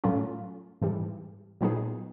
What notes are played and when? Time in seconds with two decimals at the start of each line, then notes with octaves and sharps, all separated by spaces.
0.04 A2 F#3 A3 C#4 F4
0.82 G#2 E3 G3
1.61 A#2 F#3 B3 D#4 G#4